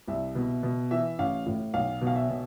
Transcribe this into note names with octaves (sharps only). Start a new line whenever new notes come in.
C2 E5
B2
B2
E3 E5
A1 F5
A2
B1 F5
B2
F5
E5
B2